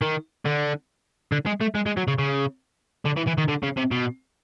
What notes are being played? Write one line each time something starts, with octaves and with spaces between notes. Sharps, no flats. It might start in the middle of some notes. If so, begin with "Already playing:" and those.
D#3
D3
D3
G#3
A3
G#3
G#3
F#3
C#3
C#3
D3
E3
E3
D#3
D3
C#3
C3
B2